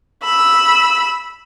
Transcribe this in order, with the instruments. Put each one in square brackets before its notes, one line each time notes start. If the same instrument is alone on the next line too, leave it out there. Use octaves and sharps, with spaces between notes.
[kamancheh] B5 E6